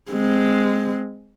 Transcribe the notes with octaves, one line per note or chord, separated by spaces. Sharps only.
G#3 C4